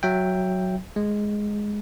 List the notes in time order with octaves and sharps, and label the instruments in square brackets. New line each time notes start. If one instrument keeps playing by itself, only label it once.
[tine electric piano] F#3 E5 G5
G#3